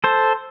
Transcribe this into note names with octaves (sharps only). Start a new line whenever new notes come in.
A4 C5